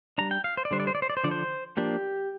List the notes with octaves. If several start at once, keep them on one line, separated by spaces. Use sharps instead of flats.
G3 D4 A#5
G5
F5
C5
D5
D3 G3 D4 C5
D5
C5
D5
C5
D5
C5
D3 F3 D4 D5
C5
F3 A#3 D4 G4